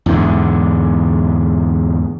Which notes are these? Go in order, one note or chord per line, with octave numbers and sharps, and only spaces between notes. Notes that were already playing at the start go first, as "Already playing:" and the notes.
E2 G#2 D3